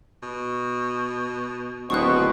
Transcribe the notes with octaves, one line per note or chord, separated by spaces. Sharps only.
B2
D1 G#1 B2 C4 C#6 D#6 F#6